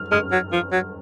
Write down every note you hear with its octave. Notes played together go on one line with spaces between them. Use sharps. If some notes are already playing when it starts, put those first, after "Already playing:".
Already playing: F6
G#3 F6
F#3
F3
F#3